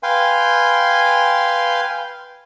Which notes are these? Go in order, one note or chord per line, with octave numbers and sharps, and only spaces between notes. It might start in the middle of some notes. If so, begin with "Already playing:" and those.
B4 F5 G5 G#5 C6